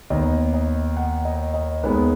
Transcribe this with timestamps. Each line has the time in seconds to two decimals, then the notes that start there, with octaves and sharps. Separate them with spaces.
0.10 D#2 D#3 B3 D#5
0.54 D#5
0.97 F#5
1.25 D#5
1.54 D#5
1.83 D#2 D#3 G#3 B3 B4